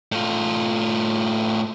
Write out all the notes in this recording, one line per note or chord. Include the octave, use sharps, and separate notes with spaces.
A2 F4